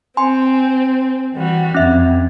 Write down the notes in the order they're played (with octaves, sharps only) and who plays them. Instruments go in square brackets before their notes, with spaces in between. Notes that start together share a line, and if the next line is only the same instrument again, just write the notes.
[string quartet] C4 [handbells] G#5 C6
[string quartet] E3 G3 F#4
[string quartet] F2 [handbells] C#4 E5